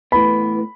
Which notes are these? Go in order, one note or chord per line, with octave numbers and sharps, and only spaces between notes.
A2 E3 B3 B5